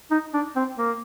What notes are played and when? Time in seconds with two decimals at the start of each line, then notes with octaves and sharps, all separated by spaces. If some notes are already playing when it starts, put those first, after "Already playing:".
0.11 D#4
0.34 D4
0.56 C4
0.77 A#3